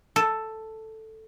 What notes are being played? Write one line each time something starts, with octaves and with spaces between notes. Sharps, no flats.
A4